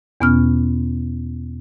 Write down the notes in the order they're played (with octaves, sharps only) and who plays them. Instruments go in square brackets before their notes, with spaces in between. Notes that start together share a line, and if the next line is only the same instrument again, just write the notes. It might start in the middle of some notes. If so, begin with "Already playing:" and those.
[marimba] E2 B2 B3 C#4 F6